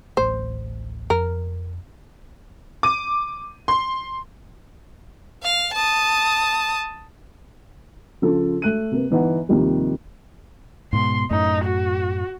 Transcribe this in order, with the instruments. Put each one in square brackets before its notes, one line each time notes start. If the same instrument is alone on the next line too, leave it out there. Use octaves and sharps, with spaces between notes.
[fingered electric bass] D1 A1 A3 [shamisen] C5
[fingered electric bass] F2 [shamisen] A#4
[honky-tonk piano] D6 D#7
C6
[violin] F5
A5 D#6
[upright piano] C#3 F3 F4 A4
A3 F#6 D#7
C3 A#3 B4
G1 E3 D#4 F#5
D#2 C3 D#3 F3 G3
[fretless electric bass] G#2 B2 [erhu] C6
[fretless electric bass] F#2 A2 A3 [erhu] D#4
[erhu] F#4